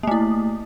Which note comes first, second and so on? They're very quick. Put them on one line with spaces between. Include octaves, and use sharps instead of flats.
A#3 A3 E4